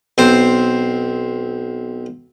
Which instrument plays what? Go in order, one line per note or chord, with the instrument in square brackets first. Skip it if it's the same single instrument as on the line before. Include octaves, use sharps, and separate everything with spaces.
[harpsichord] B1 C4 C5